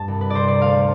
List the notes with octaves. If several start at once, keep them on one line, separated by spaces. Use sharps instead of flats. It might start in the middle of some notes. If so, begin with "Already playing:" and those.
Already playing: G2 A5
C2
B4
C3 C5 D5
D5
D2 F5